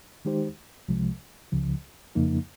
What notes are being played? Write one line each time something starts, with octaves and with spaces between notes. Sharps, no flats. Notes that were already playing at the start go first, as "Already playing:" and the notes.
D#3 G#3 D#4 G4 C5
C2 C3 F3 G#3
C#2 C#3 F3
F2 C#3 F3 A#3 D#4